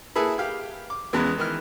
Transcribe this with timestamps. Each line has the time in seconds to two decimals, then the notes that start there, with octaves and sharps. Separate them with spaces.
0.16 A#3 E4 G#4 A4 B4
0.38 G4 F5 G5
0.90 D6
1.13 E2 C#3 E3 G#3 B3
1.38 D#3 E3 F6